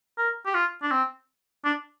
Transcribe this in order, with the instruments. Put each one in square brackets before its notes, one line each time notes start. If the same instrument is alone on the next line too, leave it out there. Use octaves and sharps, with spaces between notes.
[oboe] A#4
G4
F4
D4
C4
D4